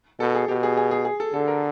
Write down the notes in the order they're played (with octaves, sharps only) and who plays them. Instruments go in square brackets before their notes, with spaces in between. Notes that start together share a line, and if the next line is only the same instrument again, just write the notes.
[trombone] B2 [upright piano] A4
[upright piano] G#4
[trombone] B2 [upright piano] G4
[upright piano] G#4
G#4
G#4
G#4
A4
[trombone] D3 [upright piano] A4
[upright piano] A#4